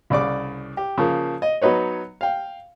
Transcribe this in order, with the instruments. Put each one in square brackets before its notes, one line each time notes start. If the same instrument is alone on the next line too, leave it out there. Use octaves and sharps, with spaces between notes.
[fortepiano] C2 C#3 D5 D6
G4
C#3 F3 A#3
D#5
F#3 B3 D#4 B4 C#5
F5 G5